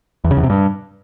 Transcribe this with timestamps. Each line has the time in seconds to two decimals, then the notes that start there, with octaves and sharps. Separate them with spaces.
0.24 E2
0.31 C#3
0.37 E2
0.43 C3
0.50 G2